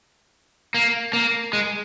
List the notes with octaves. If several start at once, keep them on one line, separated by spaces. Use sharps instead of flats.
A#3
A#3
G#3